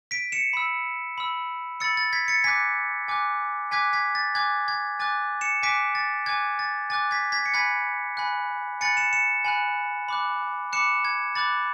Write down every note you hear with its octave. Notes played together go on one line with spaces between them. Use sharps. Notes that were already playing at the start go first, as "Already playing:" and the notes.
B6 D7
C#7 E7
B5 E6
B5 E6
B5 E6 A6 C#7
A6
G#6 B6
A6 C#7
G#5 D6 F#6 G#6 B6
G#5 D6 F#6
G#5 D6 F#6 G#6 B6
G#6 B6
A6
G#5 D6 F#6 G#6
G#6
G#5 D6 F#6 A6
C#7 E7
G#5 D6 F#6 B6 D7
A6
G#5 D6 F#6 G#6
A6
G#5 D6 F#6 A6
G#6 B6
G#6 B6
C#7
G#5 B5 F#6 G#6 B6
G#5 B5 F#6
G#5 B5 F#6 A6 C#7
C#7 E7
C#7 E7
G#5 B5 F#6
B5 D6 F#6
B5 D6 F#6 C#7 E7
G#6
B5 D6 F#6 A6